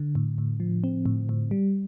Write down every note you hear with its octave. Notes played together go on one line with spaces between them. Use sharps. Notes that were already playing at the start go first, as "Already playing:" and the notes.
Already playing: D3
A2
A2
F3
C4
A2
A2
G3